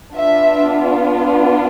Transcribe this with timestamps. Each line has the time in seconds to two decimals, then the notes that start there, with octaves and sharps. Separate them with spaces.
0.16 B3 D4 F4 E5